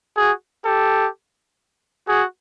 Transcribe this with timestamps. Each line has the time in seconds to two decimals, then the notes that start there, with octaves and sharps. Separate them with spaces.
0.17 F#4 G#4
0.65 G4 A4
2.08 F#4 G#4